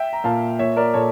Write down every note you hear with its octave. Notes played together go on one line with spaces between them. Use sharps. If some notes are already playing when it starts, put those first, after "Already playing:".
Already playing: E5 G5
A#5
A#2 F5 A5
A#2 C#5 E5
A#4 D5
A#2 A4 C#5